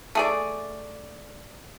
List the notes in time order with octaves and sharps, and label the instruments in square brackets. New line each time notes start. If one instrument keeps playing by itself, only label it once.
[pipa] A3 G#4 D5